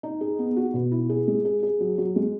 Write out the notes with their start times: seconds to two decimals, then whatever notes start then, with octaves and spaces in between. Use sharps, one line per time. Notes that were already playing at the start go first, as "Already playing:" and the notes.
0.03 D#4
0.21 G#4
0.39 B3
0.57 F#4
0.74 B2
0.92 E4
1.09 G#4
1.28 G#3
1.45 G#4
1.63 G#4
1.80 F#3
1.98 F#3
2.16 G#3